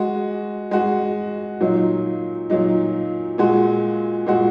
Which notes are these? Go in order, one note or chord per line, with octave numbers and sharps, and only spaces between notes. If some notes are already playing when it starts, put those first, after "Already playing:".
Already playing: G#3 F#4
G#3 F#4
A#2 F#3 D#4
A#2 F#3 D#4
A#2 G#3 F#4
A#2 G#3 F#4